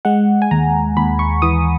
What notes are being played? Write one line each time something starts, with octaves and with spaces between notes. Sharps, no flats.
G#3 F#5
G#5
D#2 A#5
D#2 B5
C#6
E3 D#6